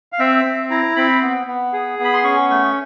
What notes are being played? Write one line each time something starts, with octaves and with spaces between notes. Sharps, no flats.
F5
C4 E5
C4
E4 A#5
C4 B5
B3
B3
G#4
B3
B5
C6
C#4 C#6
A3 C#6